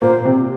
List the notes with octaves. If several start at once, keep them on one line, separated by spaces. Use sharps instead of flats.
A#2 A#3 C5
C3 C4